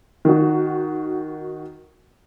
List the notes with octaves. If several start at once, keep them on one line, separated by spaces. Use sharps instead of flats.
D#3 F#4